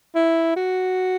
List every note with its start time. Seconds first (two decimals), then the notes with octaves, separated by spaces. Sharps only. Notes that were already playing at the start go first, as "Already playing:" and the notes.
0.15 E4
0.56 F#4